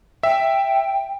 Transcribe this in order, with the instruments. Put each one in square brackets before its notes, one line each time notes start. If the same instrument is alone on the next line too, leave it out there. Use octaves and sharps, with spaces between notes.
[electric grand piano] E5 [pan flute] G5